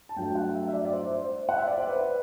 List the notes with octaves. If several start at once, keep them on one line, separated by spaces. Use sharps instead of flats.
A5
G2 F#3 A3 G5
F#5
E5
E5
D5
D5
C5
C5
F#5
E5
D5
C5
B4